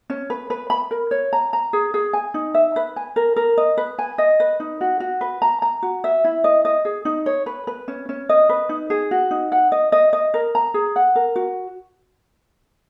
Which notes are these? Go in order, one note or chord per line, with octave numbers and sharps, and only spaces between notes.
C#4
B4
B4
B5
A#4
C#5
A#5
A#5
G#4
G#4
G#5
D#4
E5
B4
G#5
A#4
A#4
D#5
B4
G#5
D#5
B4
D#4
F#4
F#4
B4
A#5
A#5
F#4
E5
E4
D#5
D#5
G#4
D#4
C#5
B4
B4
C#4
C#4
D#5
B4
D#4
G#4
F#4
D#4
F#5
D#5
D#5
D#5
A#4
A#5
G#4
F#5
A#4
F#4